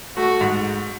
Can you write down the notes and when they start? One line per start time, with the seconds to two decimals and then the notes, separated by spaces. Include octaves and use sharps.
0.16 A3 F#4
0.41 G#2